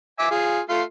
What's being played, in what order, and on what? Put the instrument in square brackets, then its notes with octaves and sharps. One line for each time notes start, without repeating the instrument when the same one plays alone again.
[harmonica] E5 G#5 D6
F4 G#4
A3 F4 C6